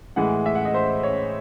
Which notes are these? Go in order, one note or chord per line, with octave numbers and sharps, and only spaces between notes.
A2 E3 G#3 F#5
E5
F#5
D#5
C5
C#5